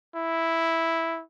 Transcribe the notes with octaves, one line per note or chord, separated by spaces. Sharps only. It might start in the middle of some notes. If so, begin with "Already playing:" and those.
E4